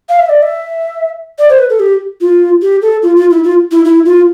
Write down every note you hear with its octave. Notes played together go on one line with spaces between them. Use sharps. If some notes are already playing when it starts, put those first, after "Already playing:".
F5
E5
D5
E5
D5
C5
B4
A4
G4
F4
G4
A4
F4
F4
E4
F4
E4
E4
F4